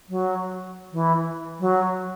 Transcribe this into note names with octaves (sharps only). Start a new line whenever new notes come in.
F#3
E3
F#3